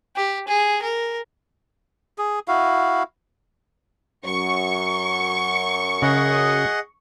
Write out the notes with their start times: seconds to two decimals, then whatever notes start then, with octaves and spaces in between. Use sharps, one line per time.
0.16 G4
0.48 G#4
0.82 A#4
2.18 G#4
2.48 E4 F#4 F5
4.26 F#2 C#6
6.02 C#3 G#4 D#5 F#5